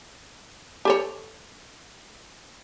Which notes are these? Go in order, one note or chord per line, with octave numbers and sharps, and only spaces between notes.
G4 A4 C#5